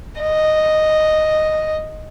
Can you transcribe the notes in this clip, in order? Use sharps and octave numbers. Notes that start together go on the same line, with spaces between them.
D#5